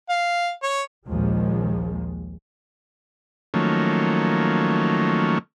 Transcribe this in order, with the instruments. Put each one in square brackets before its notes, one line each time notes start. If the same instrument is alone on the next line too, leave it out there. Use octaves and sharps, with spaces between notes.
[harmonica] F5
C#5
[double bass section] A#1 D#2 F3 G#3
[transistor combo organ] D#3 F3 F#3 A3 A#3 C#4